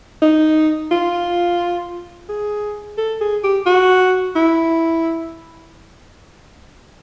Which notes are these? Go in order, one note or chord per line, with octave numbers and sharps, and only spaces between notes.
D#4
F4
G#4
A4
G#4
G4
F#4
E4